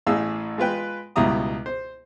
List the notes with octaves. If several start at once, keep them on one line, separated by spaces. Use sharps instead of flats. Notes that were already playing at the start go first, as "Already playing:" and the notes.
A1 A2 G#4 F5 E6
G#3 F4 B4 G5
C#2 B2 G3 E4 A#5 D#6
C5